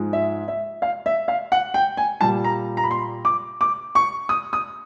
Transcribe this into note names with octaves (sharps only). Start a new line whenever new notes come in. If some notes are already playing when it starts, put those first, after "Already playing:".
Already playing: G#2 F3 G#3
E5
E5
F5
E5
F5
F#5
G5
G#5
A#2 G3 A5
A#5
A#5
B5
C6
D6
D6
C#6
D#6
D#6